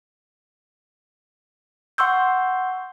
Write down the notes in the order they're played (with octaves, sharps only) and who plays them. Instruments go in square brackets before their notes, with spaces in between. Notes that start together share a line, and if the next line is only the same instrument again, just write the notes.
[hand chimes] F#5 C6 C#6 E6 G6